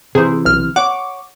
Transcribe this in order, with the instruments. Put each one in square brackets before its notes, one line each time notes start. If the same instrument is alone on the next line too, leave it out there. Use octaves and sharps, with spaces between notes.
[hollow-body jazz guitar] C3 E3 [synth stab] G#4 C5
[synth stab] B1 F6
[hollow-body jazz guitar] C#5 F#5 [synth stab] D6